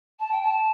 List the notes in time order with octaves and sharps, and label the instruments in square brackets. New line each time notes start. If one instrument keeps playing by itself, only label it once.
[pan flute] A5
G5
A5